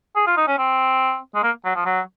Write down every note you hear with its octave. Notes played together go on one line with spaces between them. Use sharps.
G#4
F4
D#4
C#4
C4
G#3
A#3
F#3
F3
F#3